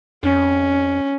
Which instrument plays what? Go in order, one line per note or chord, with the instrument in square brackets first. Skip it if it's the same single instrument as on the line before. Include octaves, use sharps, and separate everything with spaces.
[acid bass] F2 [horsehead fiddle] C#4